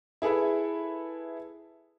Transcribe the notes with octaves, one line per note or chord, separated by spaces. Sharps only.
E4 G#4 A4 B4 E5